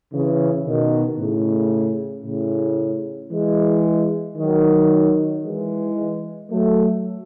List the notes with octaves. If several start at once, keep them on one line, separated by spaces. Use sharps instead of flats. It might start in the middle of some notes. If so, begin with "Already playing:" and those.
C#3 E3
B2 D#3
A2 C#3
A2 C#3
E3 G#3
D#3 F#3
E3 G#3
F#3 A3